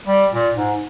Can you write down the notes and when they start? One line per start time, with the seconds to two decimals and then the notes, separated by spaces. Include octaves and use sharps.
0.07 G3
0.32 A#2
0.55 G#2